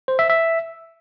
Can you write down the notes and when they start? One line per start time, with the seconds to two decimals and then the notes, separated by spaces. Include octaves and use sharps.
0.08 C5
0.19 E5
0.30 E5